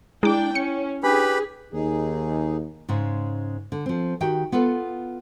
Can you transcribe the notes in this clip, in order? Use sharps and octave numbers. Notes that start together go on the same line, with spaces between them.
G#3 D4 E4 G5 D6
C#4 C#7
D4 G4 G#4 B4 B5
D#2 D#4 G#4
G#2 C#3 G#3
D3
F3 C4
D#3 F#4 G4 G5
B3 F4 A4 B4